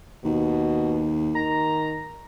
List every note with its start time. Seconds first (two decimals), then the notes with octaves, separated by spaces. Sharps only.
0.24 D#2 B2
1.35 D#3 A#5